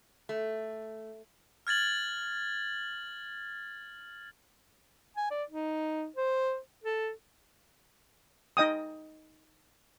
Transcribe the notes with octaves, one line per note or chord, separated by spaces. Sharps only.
A3
F6 G#6 A6 F#7
G#5
D5
D#4
C5
A4
D#4 D#5 G5 D#6